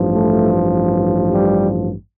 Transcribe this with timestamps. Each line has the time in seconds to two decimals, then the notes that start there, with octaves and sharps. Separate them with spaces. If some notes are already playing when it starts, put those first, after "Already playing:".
Already playing: A1 G2 F3
0.13 A3
1.32 G3